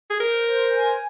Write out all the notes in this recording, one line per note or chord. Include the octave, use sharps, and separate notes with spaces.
G#4
A#4 C5
C5
G#5